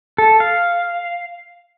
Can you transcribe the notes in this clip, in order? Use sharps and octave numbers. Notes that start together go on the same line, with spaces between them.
A4
F5